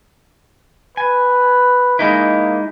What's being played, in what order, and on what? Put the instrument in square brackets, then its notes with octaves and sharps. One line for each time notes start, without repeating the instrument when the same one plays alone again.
[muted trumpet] B4 [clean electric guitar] G#5
[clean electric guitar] G#3 D#4 E4 [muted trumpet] A#3